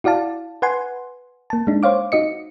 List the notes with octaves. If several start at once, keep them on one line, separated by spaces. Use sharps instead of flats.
E4 F#4 D5 F5 A5
B4 F#5 G#5 C6
A#3 A5
G#3 D4 D#4
C5 C#5 F5 D6
D#4 F#4 D#5 C#7